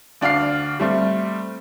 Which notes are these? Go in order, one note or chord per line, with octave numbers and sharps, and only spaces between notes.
D2 D4 F5 F6 C7
G3 A3 C4